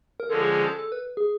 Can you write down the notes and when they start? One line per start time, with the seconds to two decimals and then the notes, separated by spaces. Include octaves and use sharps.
0.20 A#4
0.29 D3 F3 G#3 C#4 A4
0.42 G#4
0.54 G#4
0.67 A4
0.79 A4
0.92 B4
1.17 G#4